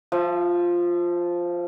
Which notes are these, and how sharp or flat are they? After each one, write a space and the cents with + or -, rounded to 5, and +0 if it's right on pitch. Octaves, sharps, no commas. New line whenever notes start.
F3 +0 E5 +45